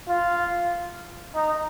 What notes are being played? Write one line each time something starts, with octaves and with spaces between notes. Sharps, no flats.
F4
D#4